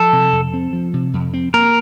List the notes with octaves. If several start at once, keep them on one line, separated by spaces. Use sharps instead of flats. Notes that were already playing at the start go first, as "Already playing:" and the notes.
Already playing: F3 A4
C3
F2
C4
F3
C3
F2
C4
A#3 A#4